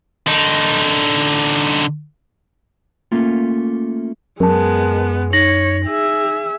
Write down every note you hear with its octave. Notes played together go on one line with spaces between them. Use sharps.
D3 D#4
A3 A#3 C#4 F4
F#2 G#3 B3 A#4 A5
D#4 C#5 A#6 F#7
G#4 E5